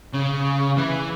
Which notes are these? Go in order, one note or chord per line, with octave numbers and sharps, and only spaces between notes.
C#3
E3